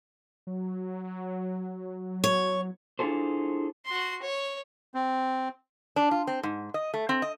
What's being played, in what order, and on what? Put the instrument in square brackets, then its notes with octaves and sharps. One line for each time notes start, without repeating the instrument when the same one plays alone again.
[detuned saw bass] F#3
[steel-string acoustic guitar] C#5
[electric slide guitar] D4 E4 F4 G#4 A4 C5
[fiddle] F#4 C6
C#5
[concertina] C4
[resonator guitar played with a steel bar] D4
F4
C4
G#2
D#5
A3
C4
D#5